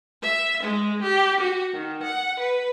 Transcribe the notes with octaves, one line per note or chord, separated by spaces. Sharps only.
E5
G#3
G4
F#4
D#3
F#5
B4